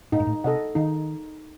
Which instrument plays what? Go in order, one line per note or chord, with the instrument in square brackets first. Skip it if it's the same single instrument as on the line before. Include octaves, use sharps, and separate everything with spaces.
[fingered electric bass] A2 [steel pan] D#4
[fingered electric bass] G#2
A2
[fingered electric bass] C3 [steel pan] A4 D#5 F#5
[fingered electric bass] D#3 [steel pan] D#4